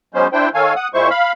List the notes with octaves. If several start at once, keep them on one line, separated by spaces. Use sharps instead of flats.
F#3 G#3 B3 C#4 C5
D4 E4 C5 G5
D#3 A4 C#5 F5 G#5
F#5 D#6
A#2 G#3 E4 C5 C#6
F5 B5